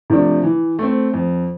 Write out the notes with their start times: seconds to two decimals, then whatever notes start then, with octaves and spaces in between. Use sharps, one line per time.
0.10 C3 F3 A3 D4
0.44 E3
0.79 A3 C4
1.14 F2